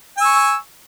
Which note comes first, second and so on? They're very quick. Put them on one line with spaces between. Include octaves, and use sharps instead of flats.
G#5 E6 C#6